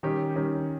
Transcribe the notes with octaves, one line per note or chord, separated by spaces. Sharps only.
D#3 G3 C#4 G4
D#3 G3 C#4 G4